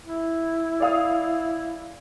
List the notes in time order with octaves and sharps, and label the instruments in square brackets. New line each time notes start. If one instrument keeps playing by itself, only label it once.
[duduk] E4
[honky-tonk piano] D5 F5 D#6